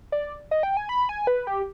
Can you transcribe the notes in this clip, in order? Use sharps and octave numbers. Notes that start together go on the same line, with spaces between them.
D5
D#5
G5
G#5
B5
G#5
B4
G4